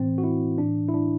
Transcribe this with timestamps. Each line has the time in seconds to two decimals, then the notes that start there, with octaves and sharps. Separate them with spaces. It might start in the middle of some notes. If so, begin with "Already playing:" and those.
Already playing: A2 E3 C4
0.18 F#4
0.24 E4
0.58 A2 E3 D4
0.89 E4
0.94 D4